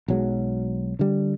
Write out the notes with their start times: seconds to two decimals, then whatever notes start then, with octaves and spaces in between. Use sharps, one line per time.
0.08 B1 F#3 G#3
0.99 D3 G3